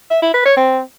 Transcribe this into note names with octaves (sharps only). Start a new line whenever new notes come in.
E5
E4
B4
C#5
C4